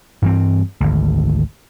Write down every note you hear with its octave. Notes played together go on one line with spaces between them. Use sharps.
G2 E3 C4
G#1 D2